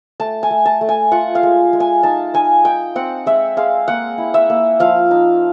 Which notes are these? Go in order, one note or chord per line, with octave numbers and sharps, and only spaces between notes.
A3 A5
G#5
A3
A5
A3
G#5
F4 F#5
F5
G#3
G#3
G#5
D#4 A5
D#4 G#5
D#4 G5
C4 F#5
G#3 E5
G#3 F5
A#3 F#5
E4
E5
A#3
F3 F5
D#4